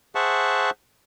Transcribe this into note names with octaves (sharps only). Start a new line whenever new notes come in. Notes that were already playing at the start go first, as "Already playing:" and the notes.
G#4 C5 E5 F#5 A5 C#6